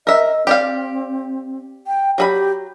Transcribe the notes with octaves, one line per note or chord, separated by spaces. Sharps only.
A#4 D#5 E5
C4 G4 D5 F5
G5
F#3 G4 G#4 B5